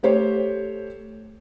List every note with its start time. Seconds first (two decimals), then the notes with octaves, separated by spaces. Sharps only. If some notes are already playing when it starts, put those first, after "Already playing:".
0.03 A3 G4 C5 C#5